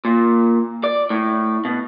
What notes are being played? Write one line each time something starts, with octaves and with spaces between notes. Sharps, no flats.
A#2
D5
A2
B2